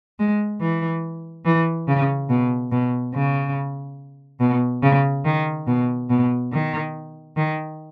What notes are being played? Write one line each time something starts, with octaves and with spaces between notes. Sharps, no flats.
G#3
E3
E3
C#3
B2
B2
C#3
B2
C#3
D#3
B2
B2
D#3
D#3